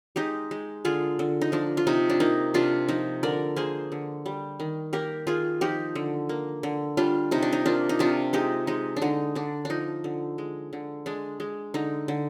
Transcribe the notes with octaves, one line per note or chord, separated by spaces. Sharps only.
G#3 D#4 G4
G#3
D3 F4 G#4
D3
D#4
F3 D4
F4
C3 D#4
D4
A#3 D#4
C3 D4 F4
F3 D#4
D3 A#4 D5
A#3 G#4 C5
D3
G3
D#3
A#3 G4 A#4
D#3 F4 G#4
F3 D#4 G4
D3
A#3
D3
G3 D4 F4
C3 D#4
D4
D#4
A#3 D4 F4
D#4
C3 D4 F4
G#3 D#4 G4
G#3 D#4
D4
D3 D#4
D3 D4
F3 D4 D#4
D3
G#3
D3
G#3 D4
G#3
D3 D#4
D3